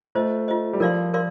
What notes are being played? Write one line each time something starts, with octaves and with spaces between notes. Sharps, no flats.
A3 F4 C5 D#5
F4 C5 D#5
G3
F3 A#4 D5 F5 C6
A#4 D5 F5 C6